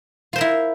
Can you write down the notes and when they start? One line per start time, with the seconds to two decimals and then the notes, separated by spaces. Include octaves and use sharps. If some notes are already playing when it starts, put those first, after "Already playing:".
0.33 F4
0.36 C5
0.38 A#4
0.41 E4